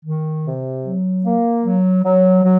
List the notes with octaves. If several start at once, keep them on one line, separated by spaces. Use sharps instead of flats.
D#3
C3
F#3
A#3
F#3
F#3
F#3